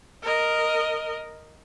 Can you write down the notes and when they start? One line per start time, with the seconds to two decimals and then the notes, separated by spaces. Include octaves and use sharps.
0.22 A#4 D#5